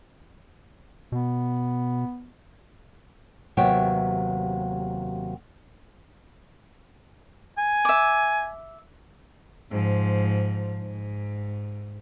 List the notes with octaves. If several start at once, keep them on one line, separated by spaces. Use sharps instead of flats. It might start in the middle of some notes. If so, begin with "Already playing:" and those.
B2 B3
D#2 C3 F#3 B3 E5 G5
G#5
E5 D6
G#2 F3
G#2